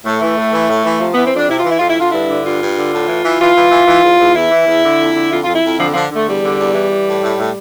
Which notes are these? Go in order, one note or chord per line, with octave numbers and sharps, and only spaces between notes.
A2 A3
E3
A2
E3
A2
E3
C3 F3
E3 B3
C4
F2 D4
C3 E4
F4
E3
E4
F2 F4
E4
D3 F4
G2 E4
D3
G2 F4
G2
D3
A2
E3
E3
E3 F4
E3
E3
E3
E2
E2
E2 E4
E3
E2
D3
F2
D3
F2 F4
F2 F4
E4
F2
D3 F3
D3 F3
D3 A3
E2 G3
D3
E2
E3
E3
A2
A2
A2